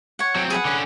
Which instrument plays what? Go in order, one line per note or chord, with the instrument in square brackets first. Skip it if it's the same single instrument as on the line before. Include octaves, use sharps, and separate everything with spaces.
[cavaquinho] C#5 F#5
[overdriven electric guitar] F#3 C4
[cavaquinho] G#4 B4 F#5
[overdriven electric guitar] D3 C#4